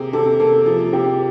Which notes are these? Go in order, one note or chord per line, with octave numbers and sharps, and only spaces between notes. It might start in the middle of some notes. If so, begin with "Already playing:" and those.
Already playing: C3 A#3 G#4
C3 A4
A#3 A4
F3 G#4
C3 G4